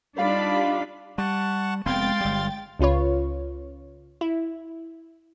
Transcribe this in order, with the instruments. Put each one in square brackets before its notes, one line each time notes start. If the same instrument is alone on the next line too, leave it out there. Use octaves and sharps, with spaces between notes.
[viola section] G3 D5 B5 [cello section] D4 D#4 F4 [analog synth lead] F5
[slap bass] G3 [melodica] F#5 A5 C#6
[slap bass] F1 B3 C4 [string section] G#3 G5 A6 [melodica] F5 C6
[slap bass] G1 G3
[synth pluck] C#2 C#4 F4 B4 C#5
E4